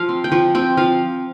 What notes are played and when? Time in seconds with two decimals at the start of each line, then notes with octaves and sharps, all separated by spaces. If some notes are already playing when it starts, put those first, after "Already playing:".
Already playing: F3 F5
0.09 C4
0.24 G5
0.32 F3
0.55 C4 G5
0.77 F3 F5